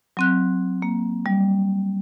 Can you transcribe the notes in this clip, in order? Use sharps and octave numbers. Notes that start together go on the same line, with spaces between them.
F#3 C4 F#6
A#3
G3